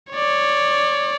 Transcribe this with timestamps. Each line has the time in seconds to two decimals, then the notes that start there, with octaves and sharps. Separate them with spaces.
0.11 C#5 D5